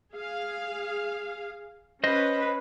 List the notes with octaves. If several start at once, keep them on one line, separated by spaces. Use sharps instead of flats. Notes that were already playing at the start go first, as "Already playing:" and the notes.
G#4 F5
C#4 B4 C5 D#5